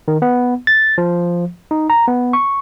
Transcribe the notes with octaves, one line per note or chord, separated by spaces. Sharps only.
D#3
B3
A6
F3
D#4
A#5
B3
C#6